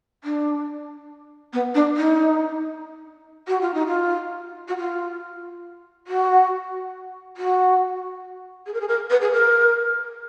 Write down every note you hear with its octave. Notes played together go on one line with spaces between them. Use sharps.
D4
B3
D4
D#4
F#4
F4
D#4
F4
F#4
F4
F#4
F#4
G#4
A#4
G#4
A#4
B4
G#4
A#4